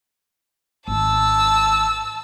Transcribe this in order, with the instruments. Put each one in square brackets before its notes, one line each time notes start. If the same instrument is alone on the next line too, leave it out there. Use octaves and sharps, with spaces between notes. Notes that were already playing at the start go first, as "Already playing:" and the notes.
[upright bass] G#1 D#3 [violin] A5 E6